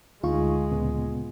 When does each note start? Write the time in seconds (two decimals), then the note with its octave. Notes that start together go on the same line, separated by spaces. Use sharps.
0.23 D2 G#3 D#4 F4 F5 C#6
0.72 A#2 C#3 B3